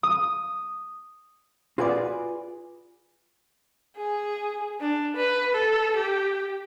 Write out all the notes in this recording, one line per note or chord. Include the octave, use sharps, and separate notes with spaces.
D#6
F4 F#4 G#4 B4 D5
G#4
D4
B4
A4
G4